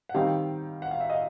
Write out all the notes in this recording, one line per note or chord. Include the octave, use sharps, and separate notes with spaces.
F#5
D#3 G3 C4 D#4 F5 G5
F#5
F5
E5
D#5 F5